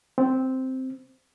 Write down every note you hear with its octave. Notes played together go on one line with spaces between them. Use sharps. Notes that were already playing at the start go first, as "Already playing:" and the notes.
C4